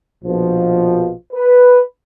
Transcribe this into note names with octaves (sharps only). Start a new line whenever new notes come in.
A#1 B2 F3
B4